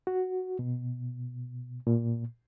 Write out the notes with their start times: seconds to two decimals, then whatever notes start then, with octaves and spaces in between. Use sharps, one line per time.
0.07 F#4
0.59 B2
1.87 A#2